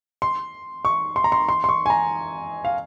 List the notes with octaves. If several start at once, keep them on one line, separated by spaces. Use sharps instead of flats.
C6
C#6
C6
A#5
C6
C6
C6
C#6
G#5
A#5
F5